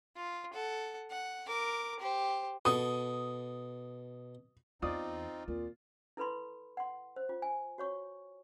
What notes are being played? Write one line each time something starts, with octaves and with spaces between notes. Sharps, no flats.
F4
A4 F#5
F#5
A#4 D6
G4 C5
B2 A4 D#6
E2 C4 D#4 F4 D5 D#6
D#2 A#2 C4
E4 A4 B4 B5 C6
F#5 C6
C5
F4
G#5
F#4 C#5 C#6